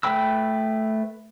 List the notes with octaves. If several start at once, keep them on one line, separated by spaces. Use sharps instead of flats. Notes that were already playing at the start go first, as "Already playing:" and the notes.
A3 B4 G5 B5 E6